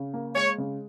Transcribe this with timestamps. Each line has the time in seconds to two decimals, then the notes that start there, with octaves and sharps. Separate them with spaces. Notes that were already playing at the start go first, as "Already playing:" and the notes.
Already playing: C#3
0.14 A#3
0.35 G#3 C#5
0.58 C#3